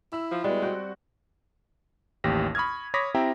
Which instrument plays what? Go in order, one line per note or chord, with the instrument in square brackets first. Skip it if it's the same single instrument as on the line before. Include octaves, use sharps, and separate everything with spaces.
[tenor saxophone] E4 [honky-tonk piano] E6
[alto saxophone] F3
[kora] G3 [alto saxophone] G#3 [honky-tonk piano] B3 F#4
[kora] C4 G5 [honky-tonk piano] F#4
[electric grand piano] A1 D#2 G4 A#6
B5 C#6 D#6 F6 G#6
C#5 B5 D6 D#6 A#6 B6
C4 E4 G4 E5 G5 A#5